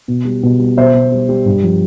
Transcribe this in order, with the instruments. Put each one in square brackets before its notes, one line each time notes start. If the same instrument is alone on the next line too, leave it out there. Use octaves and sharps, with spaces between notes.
[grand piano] B2
G3
B2
G3
B2 C5 E5
B2
G3
G3
G2
F3